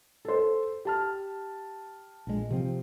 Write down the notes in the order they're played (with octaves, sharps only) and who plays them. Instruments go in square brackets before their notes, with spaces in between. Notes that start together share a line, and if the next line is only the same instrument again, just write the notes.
[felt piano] A4 C5
G4 A5 F6
[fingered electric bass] A#1 G#3
C3 F3 C4